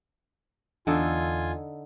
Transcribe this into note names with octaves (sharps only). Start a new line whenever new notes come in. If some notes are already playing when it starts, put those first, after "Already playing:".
E2 D3 D#4 F4 A4 G#5